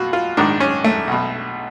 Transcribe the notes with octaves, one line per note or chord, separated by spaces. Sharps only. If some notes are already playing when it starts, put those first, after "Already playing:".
Already playing: B1 B2 F4 F#4
F4
A#1 G#2 D#3 D4
C#4
A3
B1 B2